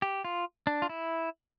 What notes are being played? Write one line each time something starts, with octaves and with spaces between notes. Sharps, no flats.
G4
F4
D4
F4
E4